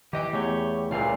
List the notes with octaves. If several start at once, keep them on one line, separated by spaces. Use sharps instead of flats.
D#3 E3 G4 D#5 G5
E2 A3 G4 C#5
C#2 A#2 E3 G3 F5